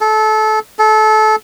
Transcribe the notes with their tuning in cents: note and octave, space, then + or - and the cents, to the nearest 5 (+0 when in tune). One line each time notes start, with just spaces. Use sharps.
A4 -25
A4 -25